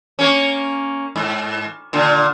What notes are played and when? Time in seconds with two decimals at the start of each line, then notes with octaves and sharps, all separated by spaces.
0.19 A#3 C#4
1.16 G#2
1.93 A#2 D3